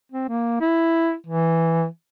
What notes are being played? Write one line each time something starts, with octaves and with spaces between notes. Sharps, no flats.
C4
A#3
E4
E3